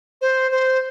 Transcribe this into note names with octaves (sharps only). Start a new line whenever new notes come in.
C5
C5